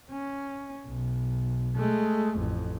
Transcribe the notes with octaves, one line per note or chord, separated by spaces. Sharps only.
C#4
B1
G#3 A3
A1 F2